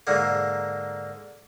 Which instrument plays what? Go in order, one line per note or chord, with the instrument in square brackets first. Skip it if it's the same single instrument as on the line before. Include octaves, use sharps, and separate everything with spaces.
[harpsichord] G#2 D3 A#3